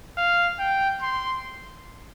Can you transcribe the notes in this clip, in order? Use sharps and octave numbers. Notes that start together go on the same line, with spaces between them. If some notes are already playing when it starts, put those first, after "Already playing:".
F5
G5
C6